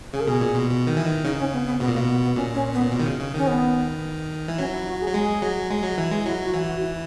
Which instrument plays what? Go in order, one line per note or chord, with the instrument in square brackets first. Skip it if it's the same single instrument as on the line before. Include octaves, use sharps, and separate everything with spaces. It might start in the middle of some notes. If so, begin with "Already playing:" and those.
[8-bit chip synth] C#3 [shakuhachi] G#4
[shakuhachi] A#4
[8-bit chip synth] B2 [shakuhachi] G#4
[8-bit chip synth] A#2
B2
B2
D#3
E3
D#3
[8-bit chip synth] C#3 [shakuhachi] D#4
[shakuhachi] C#4
B3
B3
[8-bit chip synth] B2 [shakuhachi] B3
[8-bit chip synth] A#2
[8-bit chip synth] B2 [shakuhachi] A#3
[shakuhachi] B3
B3
[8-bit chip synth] A#2 [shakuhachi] C#4
[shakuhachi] C#4
B3
[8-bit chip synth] A#2
B2
D#3
C#3
C#3
[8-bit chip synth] D#3 [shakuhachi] C#4
[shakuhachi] B3
[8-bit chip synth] E3
[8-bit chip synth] F#3 [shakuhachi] C#4
[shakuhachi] E4
F#4
G#4
[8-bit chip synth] F#3
[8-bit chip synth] G#3 [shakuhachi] G#4
[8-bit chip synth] F#3
G#3
F#3
E3
G#3
[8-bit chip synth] F#3 [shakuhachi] E4
[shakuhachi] F#4
[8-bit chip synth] E3
[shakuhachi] F#4
E4